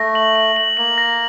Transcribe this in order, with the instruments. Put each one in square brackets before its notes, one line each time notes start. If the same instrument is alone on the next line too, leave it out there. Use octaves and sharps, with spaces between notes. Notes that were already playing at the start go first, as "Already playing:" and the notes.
Already playing: [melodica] A3 [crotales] A#6
[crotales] F#7
F#7
F#7
[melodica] A#3 [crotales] F#7
[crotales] A#6